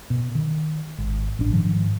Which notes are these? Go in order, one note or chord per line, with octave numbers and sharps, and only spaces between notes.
B2
D#3
G#1
A1 D4
G#2 D#3 F3